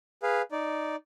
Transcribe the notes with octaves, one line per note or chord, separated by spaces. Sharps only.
G#4 B4 F5
D#4 D5